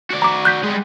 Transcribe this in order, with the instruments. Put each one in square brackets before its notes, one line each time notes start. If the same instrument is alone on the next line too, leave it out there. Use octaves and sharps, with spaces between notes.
[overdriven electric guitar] F#4 D5
[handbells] A#5 D6
F#6 G6 B6
[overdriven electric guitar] G3 G#3